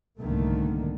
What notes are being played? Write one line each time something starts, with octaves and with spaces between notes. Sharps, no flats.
C2 G#2 D3 D#3 A3 A#3